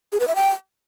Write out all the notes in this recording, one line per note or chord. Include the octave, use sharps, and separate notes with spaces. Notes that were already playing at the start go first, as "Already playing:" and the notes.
G#4
B4
E5
G5